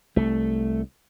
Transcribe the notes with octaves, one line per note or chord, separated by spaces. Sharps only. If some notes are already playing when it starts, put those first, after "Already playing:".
C2 A3